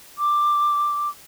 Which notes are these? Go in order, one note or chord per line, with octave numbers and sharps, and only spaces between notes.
D6